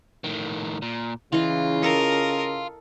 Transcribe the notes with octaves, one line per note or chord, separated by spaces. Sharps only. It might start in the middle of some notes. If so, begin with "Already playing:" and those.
A2 D#3
A#2
C#3 E3 F4 D#5
A4 A#4 D#5 F5